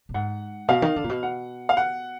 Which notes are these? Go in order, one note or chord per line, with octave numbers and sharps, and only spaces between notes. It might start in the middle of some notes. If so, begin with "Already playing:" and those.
A#2
G#2 F#5
B2 F5
D#3
D3
A#2
B2
F#5
F5
F#5